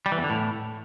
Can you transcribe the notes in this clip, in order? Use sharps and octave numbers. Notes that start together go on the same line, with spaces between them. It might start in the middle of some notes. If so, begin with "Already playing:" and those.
G3
E3
E2
D3
A2